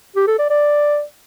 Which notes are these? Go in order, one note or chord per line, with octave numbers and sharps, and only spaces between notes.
G4
A4
D5
D5